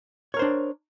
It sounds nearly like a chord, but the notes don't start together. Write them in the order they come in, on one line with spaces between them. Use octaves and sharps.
C#5 A#4 C5 D4